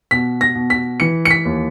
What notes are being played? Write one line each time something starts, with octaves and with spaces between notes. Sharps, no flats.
B2 B6
A#6
B2
B6
E3 C#7
C#7
B6
D#2